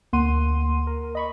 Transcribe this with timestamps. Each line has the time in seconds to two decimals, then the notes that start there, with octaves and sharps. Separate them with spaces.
0.13 D2 A#3 F#5 C6 D#7
0.87 A#4
1.15 D#5 B5 C#6